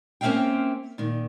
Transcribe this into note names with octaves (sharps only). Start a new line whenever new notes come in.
A#3 C4 C#4 E5 F5 G5
A#2 D#3